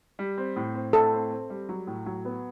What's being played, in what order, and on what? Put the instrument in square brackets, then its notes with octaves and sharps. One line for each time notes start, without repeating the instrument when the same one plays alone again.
[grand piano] G3
C4
A2
C4
[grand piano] A2 [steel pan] A4
[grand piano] C4
C4
G3
F#3
A2
F#3
B3